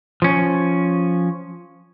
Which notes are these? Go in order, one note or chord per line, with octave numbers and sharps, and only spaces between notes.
F3 C#4